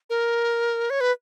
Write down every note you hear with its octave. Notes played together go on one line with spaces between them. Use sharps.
A#4
C#5
B4